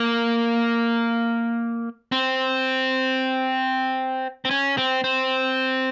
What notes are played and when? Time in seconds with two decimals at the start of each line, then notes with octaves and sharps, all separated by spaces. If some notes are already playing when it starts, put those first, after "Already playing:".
Already playing: A#3
2.12 C4
4.45 C4
4.51 C#4
4.78 C4
5.04 C4